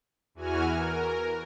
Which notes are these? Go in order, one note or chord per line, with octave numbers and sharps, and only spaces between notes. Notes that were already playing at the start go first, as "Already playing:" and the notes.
E2 E3 F#4 G#5 F6
A#4